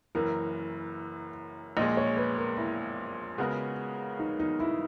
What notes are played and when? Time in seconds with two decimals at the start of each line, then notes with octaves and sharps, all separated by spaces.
0.15 F#1 F#2 E3 A#4
1.77 A#1 A#2 G#3 D#5
1.97 C#5
2.17 B4
2.37 A#4
2.57 E4
3.38 C#3 G#3 B3 F#4 A#4
4.19 D#4
4.40 D#4
4.60 E4